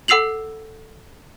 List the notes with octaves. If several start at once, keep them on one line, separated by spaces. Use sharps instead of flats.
A4 F#5 E6 C7 F7 F#7